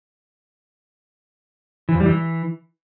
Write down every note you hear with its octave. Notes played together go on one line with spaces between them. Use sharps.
E3
F2
G3
E3